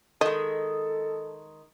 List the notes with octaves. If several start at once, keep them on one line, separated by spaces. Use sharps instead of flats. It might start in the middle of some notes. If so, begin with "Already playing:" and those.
D#3 G#3 A4 D#5